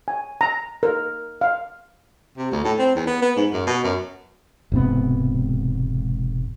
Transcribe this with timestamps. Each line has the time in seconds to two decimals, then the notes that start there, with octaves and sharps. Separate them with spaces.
0.08 G#5
0.41 A#5
0.83 A#4
1.41 F5
2.37 C3
2.52 D2
2.64 A2
2.78 C4
2.95 E2
3.07 B3
3.22 B3
3.36 G#2
3.53 F#2
3.67 B2
3.84 F#2
4.72 E1 G#2 C3 B3